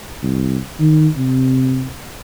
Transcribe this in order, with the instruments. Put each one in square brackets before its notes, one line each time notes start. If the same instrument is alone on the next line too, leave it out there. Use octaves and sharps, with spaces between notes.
[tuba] C2
D#3
C3